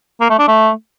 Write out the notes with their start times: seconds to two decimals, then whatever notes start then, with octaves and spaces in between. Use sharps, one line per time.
0.21 A#3
0.30 A3
0.39 D4
0.48 A3